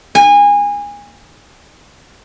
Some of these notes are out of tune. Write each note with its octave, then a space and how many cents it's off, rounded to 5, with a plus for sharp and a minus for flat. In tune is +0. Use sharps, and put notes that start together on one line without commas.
G#5 -25